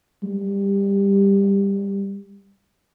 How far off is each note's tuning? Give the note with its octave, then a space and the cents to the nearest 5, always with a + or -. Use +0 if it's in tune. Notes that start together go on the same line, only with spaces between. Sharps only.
G3 +15